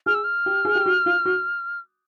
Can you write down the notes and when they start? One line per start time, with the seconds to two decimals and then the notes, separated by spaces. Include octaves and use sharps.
0.06 G#4 F6
0.14 E6
0.24 F6
0.46 G4
0.65 G#4
0.75 G4
0.86 F#4
1.06 F4
1.25 F#4